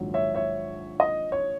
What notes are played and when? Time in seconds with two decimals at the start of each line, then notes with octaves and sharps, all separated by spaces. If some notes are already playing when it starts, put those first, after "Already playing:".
Already playing: A#1 G#2 D#3 F#3
0.14 C#5 E5
0.34 C#5 E5
1.00 D#5
1.32 C#5